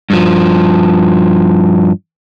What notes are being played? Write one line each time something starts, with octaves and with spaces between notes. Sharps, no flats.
G2 F3